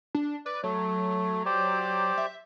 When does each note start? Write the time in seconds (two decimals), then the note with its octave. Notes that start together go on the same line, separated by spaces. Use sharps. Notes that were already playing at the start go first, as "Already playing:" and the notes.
0.15 D4
0.46 B4 D5
0.63 F#3 A3
1.46 G4 C5 D5
2.18 E5